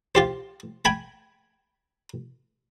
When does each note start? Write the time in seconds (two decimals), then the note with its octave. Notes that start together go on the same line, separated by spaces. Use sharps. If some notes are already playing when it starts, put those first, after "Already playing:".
0.15 F4 G4 C5
0.85 G5 G#5 B5